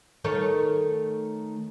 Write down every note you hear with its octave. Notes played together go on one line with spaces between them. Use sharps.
D#3 A3 C#5